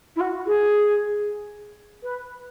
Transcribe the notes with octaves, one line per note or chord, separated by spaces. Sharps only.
E4
F#4
G#4
B4